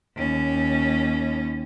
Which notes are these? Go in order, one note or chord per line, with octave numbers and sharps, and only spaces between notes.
D#2 C#4